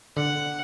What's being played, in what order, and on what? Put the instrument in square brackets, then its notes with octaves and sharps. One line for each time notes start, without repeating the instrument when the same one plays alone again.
[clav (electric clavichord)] D3 [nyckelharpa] F#5